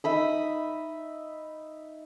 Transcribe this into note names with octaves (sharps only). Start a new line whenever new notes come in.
D#4 E5 B5 D#6